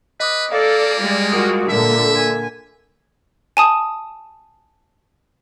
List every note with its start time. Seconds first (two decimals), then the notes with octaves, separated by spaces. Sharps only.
0.20 B4 D#5 D6 D#6
0.52 A#3 A4 D5 F5
0.99 G3 G#3
1.32 F4 F#4 A#4 D6 D#6
1.69 A#2 D3 A#4 E5 F#5
2.15 G#5
3.57 G#5 A5 D#6